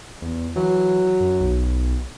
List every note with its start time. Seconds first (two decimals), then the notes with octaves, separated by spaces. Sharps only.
0.22 E2
0.56 E3 F#3
1.20 F#2
1.40 B1